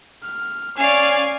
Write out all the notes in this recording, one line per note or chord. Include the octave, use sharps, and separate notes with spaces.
F6
C#4 D5 F5 G#5